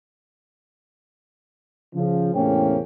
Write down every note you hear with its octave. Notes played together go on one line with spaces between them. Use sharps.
C#3 F3
E2 A2 C3 A#3 C#4 G5